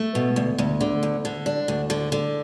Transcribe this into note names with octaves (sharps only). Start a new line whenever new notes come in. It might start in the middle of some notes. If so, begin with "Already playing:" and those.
Already playing: A3
B2
D2
D2
D3
D2
D3
D4
D2
D3
D3